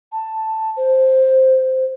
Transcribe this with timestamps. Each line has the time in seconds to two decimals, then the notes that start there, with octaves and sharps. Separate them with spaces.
0.12 A5
0.77 C5